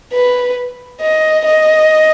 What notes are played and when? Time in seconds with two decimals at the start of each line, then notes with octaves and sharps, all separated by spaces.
0.13 B4
1.01 D#5
1.45 D#5